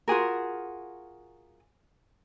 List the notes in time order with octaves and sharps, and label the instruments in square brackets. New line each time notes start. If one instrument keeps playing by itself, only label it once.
[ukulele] F4 F#4 G#4 A#4